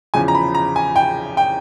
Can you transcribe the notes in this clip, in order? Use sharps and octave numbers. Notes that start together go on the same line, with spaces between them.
E2 C#3 F3 G#5
A#5
B5
A#5
G#5
G5
G5